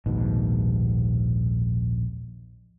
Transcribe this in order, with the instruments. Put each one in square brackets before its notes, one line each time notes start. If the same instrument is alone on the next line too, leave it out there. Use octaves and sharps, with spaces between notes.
[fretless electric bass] A#1 D#2 G#2 B2